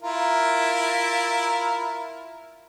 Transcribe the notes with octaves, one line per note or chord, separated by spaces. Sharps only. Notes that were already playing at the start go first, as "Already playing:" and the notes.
E4 F4 A#4